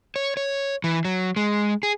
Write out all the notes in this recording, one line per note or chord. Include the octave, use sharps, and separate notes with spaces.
C#5
C#5
E3
F#3
G#3
G#4